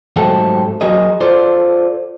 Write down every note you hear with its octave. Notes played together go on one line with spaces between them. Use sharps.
G#2 F#3 A3 C4 G4 A4
F#3 F#4 G#4 A#4 D#5
F4 A4 C5 D5